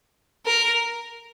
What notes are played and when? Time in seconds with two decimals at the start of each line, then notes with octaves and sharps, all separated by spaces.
0.46 A#4